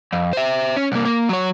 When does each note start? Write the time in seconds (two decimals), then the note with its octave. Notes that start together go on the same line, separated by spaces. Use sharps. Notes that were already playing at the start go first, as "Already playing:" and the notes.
0.13 F2
0.33 C5 E5
0.76 C#4
0.92 C2 A#3
1.05 A#3
1.29 F#3 C#5